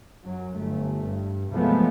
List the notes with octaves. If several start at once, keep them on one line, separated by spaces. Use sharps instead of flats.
F#2 F#3
G1 A3
G2
C3 F3 F#3 G#3 A3 B3